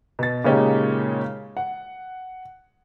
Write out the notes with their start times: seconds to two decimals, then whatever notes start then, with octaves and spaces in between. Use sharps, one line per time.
0.19 B2 A6
0.44 A#2 C#3 G#3 C#4 D#4 G4
1.57 F#5